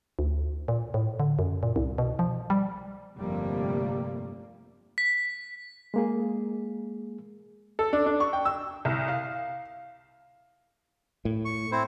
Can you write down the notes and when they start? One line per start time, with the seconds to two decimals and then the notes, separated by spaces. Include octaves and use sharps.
0.19 D2
0.68 A#2
0.94 A2
1.20 D3
1.39 F#2
1.63 A#2
1.76 C2
1.98 B2
2.19 F3
2.50 G3
3.16 G1 F2 C3 G3 A3 A#3
4.98 B6
5.94 G#3 A#3 G#4
7.79 A4
7.93 D4
8.06 D4
8.20 C#6
8.33 G5
8.45 E6
8.85 C2
9.08 F5
11.25 A2
11.45 C#6
11.72 C4 E4 C5